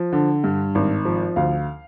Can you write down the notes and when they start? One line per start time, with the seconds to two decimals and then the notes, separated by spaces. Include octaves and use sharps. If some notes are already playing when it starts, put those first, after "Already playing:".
Already playing: F3
0.12 D3
0.44 G2
0.75 G#1
1.05 F3
1.36 D2 F5